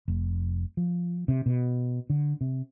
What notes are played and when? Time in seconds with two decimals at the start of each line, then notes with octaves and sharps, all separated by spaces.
0.08 F1
0.77 F3
1.28 C3
1.46 B2
2.10 D3
2.41 C3